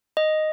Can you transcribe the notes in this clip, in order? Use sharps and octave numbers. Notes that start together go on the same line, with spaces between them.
D#5